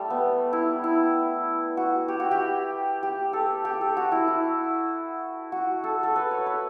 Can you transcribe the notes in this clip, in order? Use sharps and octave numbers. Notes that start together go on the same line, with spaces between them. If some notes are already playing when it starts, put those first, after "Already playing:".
Already playing: G3 A3
B3
E4
E4
F#4
G4
F#4
G4
G4
A4
G4
A4
F#4
E4
E4
F#4
A4
A4
B4
C#5
B4